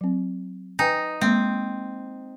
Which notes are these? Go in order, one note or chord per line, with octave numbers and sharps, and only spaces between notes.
F#3 C4
D#4 B4 G5 G#5
G#3 A#3 C4